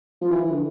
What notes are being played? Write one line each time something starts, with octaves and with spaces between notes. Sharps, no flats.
F3
E3
E3
D3